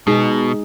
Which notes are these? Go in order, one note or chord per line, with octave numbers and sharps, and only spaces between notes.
B2 G#3 D#4 G#4